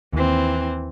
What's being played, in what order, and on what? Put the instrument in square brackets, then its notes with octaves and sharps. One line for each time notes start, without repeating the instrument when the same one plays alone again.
[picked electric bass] D#2 [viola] E3 C4